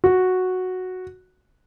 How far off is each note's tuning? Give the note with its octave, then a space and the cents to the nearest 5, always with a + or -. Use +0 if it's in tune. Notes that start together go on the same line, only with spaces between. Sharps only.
F#4 -5